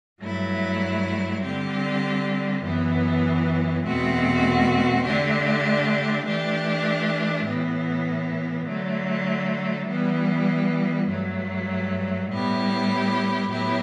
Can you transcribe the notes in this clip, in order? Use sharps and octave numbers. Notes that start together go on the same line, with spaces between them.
G2 F#3 A3 E4
D3 G3 C4 G4
F#2 E3 B3
E2 B2 A3 C4 F#4
D3 A3 D4 G4
E3 A3 D4 G4
A2 E3 B3
D3 F#3 A3
E3 G3 B3
G2 F#3 A3
A2 G3 B3 E4 G4
A2 F#3 B3 E4 G4